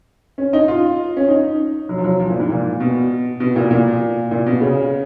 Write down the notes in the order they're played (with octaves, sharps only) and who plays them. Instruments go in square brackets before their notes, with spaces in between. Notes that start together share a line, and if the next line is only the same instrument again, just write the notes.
[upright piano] C#4
D#4
F4
C#4
D#4
F#3
F3
F#3
F3
A#2
G#2
A#2
B2
B2
A#2
B2
A#2
A#2
B2
C#3